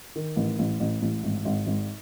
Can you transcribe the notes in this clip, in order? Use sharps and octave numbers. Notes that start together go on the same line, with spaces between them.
D#3
A1
A1
A1
A1
G#1
G#1
G#1